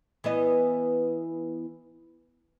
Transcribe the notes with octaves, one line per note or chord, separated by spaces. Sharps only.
E3 B3 D#5